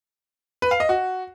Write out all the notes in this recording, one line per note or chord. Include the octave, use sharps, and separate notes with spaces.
B4
F5
D#5
F#4